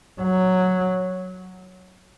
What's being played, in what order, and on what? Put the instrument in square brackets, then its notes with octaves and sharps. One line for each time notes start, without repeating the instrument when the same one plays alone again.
[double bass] F#3